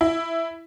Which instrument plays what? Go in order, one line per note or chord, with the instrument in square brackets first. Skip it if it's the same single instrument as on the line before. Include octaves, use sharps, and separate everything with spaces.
[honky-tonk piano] E4